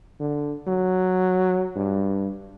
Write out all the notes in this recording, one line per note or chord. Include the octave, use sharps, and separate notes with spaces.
D3
F#3
G2